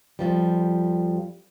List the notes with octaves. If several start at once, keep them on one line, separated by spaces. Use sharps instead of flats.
F2 G#2 F3 G3